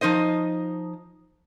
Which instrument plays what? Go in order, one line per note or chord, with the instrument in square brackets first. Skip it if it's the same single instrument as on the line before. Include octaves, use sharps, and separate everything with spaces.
[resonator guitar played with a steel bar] F3 D#4 C5 D#5